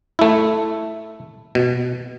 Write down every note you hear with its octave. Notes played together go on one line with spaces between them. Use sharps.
A3 E4
B2